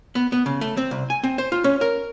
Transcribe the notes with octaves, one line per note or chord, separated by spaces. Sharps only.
B3
B3
C#3
A3
C4
C2
G#5
C4
C5
F4
C#4
A#4